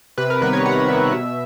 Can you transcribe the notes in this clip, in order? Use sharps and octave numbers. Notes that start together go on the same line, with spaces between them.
C3 B4
A#4
D#3 G3 B3 B4
C#5
C3 F#5
D#3 G3 B3 E5
B2